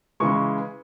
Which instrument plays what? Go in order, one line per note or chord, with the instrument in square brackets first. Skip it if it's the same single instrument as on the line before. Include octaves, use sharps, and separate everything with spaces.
[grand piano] C#3 E3 G#3 C#6